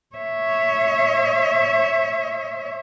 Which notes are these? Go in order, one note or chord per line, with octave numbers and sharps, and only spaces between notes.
C#5 E5